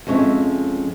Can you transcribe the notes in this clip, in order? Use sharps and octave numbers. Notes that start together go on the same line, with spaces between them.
F2 G#3 C#4 C#5 E5